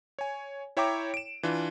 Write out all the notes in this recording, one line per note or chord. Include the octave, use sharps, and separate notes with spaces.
C#5 G#5
E4 C#5 E5 G5 A#5 D6
D7 E7
E3 D4 F4